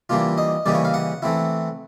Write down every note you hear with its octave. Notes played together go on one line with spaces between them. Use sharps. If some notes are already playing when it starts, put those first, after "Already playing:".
E3 G3 A#3 D4 F4
D#5
C#3 E3 G3 A#3 D#4 D5
C#5
F5
F#5
E3 A3 C4 E4